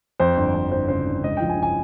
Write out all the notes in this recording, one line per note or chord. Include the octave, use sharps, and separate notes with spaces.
F2 C5
G1
F2
G1 C5
C#3 C5
G1
C#2 D#5
F3 G5
G#5
C#3
G#5